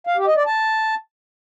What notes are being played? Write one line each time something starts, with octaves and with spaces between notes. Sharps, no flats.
F5
G4
D#5
D5
A5